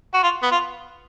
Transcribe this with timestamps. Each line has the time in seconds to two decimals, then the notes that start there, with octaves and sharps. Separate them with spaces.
0.14 F#4
0.23 F4
0.43 B3
0.52 F4